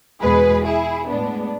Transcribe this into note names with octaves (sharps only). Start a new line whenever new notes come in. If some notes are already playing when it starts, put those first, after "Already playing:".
E2 B2 G#3 G#4 B4
E4 G#4
A2 G#3 B3 D4